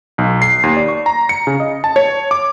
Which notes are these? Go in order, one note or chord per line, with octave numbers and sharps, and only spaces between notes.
B1
C7
D#2
D5
C#6
A#5
C#7
C#3
D#5
A5
C#5
D6